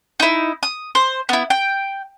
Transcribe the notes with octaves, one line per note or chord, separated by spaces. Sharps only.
D#4 E4
D#6
C5
B3 E4
G5